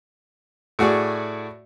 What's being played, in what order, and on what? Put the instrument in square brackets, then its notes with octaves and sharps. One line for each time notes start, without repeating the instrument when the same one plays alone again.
[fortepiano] A2 F#4 G#4 D5